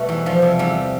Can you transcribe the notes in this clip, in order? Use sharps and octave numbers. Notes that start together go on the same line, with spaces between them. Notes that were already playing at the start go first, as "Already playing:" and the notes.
Already playing: B2 G3 A3 B3
E2
F3 G3
C3
E2 G3